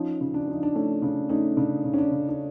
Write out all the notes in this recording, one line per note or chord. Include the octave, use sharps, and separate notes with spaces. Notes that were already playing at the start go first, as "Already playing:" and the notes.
Already playing: F3 C#4 D#4
C#3
D4
F3 D#4
D4
A3 C#4
C#3 D4
A3 C#4 D#4
C#3 D4
C#3
C#4
D4
C#3
D4